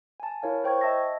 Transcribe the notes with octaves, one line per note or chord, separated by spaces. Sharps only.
G#5 A5
E4 A#4 C#5 F5
C5 G5 C#6 G#6
D#5 E5 A5 E6 A#6